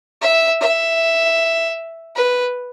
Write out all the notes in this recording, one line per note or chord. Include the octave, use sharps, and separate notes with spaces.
E5
E5
B4